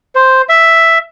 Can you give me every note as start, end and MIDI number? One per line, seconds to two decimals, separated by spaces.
0.15 0.42 72
0.49 0.98 76